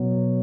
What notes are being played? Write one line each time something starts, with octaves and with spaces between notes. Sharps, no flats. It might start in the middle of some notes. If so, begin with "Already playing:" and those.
Already playing: B2 F#3